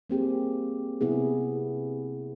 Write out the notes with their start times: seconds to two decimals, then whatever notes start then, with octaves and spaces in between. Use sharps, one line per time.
0.10 A#3 C4 G4 G#4
1.01 C3 B3 E4 G#4